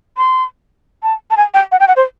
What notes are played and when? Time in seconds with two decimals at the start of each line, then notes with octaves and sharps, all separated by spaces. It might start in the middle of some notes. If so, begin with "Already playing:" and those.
0.17 C6
1.03 A5
1.31 A5
1.37 G#5
1.54 G5
1.72 F#5
1.80 G5
1.88 F#5
1.96 C5